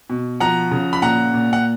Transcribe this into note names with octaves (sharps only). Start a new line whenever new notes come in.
B2
F3 F#5 A#5
C#3
B5
A#2 F#5 A#5
A#2
F#5